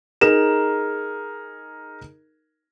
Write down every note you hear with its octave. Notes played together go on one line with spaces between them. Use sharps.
D#4 G#4 A#4 E7